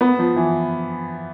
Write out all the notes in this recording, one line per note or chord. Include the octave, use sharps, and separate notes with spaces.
B3
F3
E3